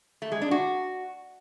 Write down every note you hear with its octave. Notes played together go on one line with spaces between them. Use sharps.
A3
G#3
D4
F#4